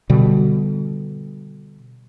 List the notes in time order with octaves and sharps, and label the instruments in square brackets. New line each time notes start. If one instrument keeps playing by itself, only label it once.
[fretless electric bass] B2 D3 G3